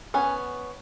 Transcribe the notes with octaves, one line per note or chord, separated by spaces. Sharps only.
B3 C#4 G#5